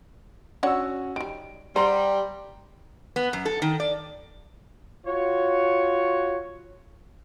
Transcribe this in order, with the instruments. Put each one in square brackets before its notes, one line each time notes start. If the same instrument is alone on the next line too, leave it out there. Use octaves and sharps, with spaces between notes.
[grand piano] C#4 F#4 E6 [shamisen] D4 C#5 F#5
[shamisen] D#3 G3 [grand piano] D7
[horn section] G3 [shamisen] C5 [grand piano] F#5 A#5 C6
[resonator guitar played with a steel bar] B3
F#2
A4
D#3
D5
[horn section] F4 F#4 C#5